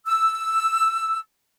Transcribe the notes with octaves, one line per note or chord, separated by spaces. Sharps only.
E6